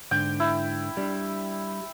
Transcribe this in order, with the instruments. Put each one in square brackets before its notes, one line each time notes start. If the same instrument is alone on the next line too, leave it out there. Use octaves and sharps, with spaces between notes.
[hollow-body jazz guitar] G#2 D3 [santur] G5
[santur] E4
[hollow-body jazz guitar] G3 D4